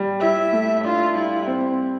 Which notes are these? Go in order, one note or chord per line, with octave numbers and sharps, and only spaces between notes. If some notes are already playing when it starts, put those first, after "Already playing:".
Already playing: G3
E4 E5
A3
D4 F4
G3 E4
C4